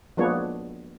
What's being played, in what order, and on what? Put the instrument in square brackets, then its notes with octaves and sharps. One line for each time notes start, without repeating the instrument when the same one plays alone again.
[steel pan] F3 G#3 A#3 B3 D4 C#5